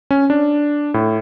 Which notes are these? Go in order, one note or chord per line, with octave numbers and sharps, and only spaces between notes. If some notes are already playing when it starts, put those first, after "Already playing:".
C#4
D4
A2